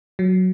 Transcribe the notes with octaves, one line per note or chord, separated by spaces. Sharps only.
F#3